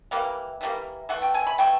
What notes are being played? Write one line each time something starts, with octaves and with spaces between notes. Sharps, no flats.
E3 G3 A#3 F5
E3 G3 A#3
E3 A3 F#5
G5
G#5
B5
E3 A3 G5